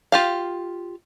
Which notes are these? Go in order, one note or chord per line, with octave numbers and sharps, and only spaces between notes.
F4 G4 F5